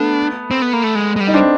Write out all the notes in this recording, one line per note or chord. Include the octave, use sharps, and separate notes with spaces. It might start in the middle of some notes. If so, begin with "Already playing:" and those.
Already playing: A3 B3 D4
C4
B3
A#3
A3
G#3
G#3
G3
D#4
C4 D4